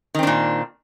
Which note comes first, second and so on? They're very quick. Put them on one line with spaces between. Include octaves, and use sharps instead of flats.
D#3 C4 D4 A#2